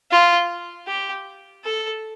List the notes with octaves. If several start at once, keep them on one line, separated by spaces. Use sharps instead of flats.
F4
G4
A4